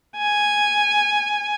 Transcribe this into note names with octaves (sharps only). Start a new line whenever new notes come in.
G#5